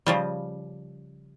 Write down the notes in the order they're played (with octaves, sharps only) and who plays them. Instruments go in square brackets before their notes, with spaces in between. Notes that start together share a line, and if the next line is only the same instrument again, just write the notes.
[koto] C#3 F3 G3